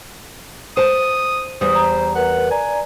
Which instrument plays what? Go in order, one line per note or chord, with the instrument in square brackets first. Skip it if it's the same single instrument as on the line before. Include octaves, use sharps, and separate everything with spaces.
[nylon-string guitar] C5 A5 [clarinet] D#6
[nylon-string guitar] E2 G3 [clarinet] C5 [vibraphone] D#6
[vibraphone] A#5
[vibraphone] A#4 B4 [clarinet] F#5
[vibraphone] D5 A#5 [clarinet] G#5